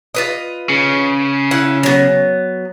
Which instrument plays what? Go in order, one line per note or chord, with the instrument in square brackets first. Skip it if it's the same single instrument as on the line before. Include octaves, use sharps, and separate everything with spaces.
[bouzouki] F4 B4 D#5
[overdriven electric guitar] C#3
[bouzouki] E4 F#5
F#3 B3